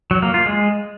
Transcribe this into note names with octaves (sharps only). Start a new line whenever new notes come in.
F#3
A#3
F4
G#3